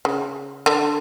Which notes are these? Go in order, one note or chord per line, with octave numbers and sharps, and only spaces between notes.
C#3
D3